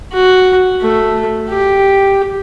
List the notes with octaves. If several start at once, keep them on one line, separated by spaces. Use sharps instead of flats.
F#4
A3
G4